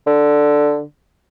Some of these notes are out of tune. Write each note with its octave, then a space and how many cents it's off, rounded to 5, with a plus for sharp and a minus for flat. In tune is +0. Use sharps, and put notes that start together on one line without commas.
D3 +5